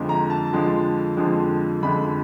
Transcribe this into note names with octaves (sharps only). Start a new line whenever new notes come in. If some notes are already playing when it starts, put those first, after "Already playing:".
Already playing: F2 D3 F3 G#3
A#5
A5
F2 D3 F3 G#3
F2 D3 F3 G#3
F2 D3 F3 G#3 B5